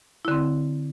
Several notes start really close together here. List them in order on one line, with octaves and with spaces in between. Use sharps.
E4 D3 C4